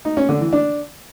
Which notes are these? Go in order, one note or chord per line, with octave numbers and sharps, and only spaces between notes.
D#4
C#4
D3
E3
D4